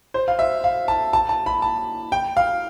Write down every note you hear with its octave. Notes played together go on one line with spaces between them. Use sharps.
C5
F5
E5
F5
A5
A5
A5
B5
A5
G5
F5